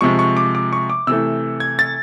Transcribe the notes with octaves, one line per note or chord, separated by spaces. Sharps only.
C3 F3 G#3 C#6
C#6
D6
D6
C#6
D6
C3 E3 A3 E6
G#6
A6